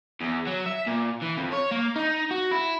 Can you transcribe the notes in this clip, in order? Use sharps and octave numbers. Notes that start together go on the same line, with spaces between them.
E2
F#3
E5
A#2
E3
F2
C#5
A#3
D#4
F#4
E4